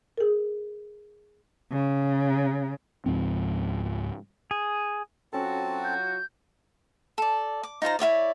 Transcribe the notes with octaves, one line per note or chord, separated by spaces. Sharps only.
G#4 A#4
C#3
C#2 G#2 F3 C4
G#4
F#3 C4 C#4 F4 F#4 A4 A5
G6
A4 D5
D6
D#4 F4 C5 A#5
E4 F4 C#5 D5